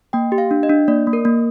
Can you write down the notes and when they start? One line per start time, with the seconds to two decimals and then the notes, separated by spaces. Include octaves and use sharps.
0.13 A#3 G5
0.32 G4
0.38 F5
0.51 D4
0.63 D#5
0.70 D4
0.88 A#3 D5
1.07 A#3
1.13 A#4
1.25 A#3